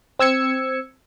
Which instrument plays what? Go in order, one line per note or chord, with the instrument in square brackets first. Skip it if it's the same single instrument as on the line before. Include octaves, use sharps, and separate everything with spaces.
[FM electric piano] C4 E6 G#6 C#7